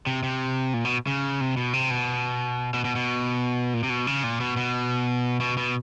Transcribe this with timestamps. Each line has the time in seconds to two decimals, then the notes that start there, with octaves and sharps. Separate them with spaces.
0.07 C3
0.23 C3
0.74 A#2
0.85 B2
1.07 C#3
1.41 C3
1.57 B2
1.73 C3
1.90 B2
2.74 B2
2.85 B2
2.96 B2
3.74 A#2
3.83 C3
3.90 B2
4.07 C#3
4.24 A#2
4.40 B2
4.57 B2
5.40 B2
5.57 B2